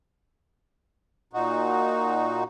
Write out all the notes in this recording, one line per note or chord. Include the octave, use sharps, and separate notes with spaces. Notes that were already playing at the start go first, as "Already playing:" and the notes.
A#2 D#4 F#4